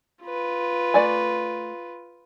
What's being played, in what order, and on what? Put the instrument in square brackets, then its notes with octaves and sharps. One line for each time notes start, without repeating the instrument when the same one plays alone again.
[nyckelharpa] F4 B4
[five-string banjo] A3 D5 G#5